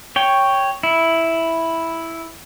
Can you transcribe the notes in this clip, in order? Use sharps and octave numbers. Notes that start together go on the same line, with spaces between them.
C#5 G5
E4